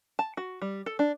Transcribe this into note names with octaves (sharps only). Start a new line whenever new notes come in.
A5
F#4
G3
A4
D4